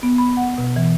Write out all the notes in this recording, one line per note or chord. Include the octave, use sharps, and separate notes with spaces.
B3
B5
F#5
B2
E3